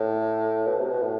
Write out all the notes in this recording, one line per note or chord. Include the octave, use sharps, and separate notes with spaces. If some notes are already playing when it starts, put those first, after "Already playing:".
Already playing: A2
B2
C3
B2
A2